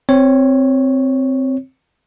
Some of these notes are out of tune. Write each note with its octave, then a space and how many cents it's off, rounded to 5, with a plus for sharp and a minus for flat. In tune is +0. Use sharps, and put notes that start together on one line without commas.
C4 +0 C#5 +0